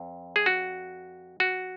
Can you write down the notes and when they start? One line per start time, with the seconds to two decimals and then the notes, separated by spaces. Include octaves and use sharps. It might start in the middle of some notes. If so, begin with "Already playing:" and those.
Already playing: F2
0.36 G#4
0.46 F#4
1.40 F#4